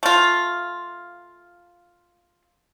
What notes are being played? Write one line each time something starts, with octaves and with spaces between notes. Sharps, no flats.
A3 F4